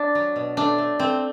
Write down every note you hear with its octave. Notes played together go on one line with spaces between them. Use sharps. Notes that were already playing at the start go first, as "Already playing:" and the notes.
Already playing: D4
F#3
B2
A3 D4
A3
A3 C4